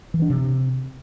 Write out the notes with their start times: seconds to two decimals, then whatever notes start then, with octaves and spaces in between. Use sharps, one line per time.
0.14 E3
0.22 D4
0.30 C3